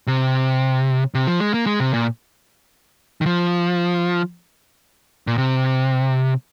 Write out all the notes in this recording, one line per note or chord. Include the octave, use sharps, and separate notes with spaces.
C3
C3
F3
G#3
A#3
G#3
C3
A#2
D#3
F3
A#2
C3